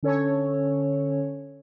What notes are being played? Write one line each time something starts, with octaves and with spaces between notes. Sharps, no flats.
D3 C#4 A4 C#5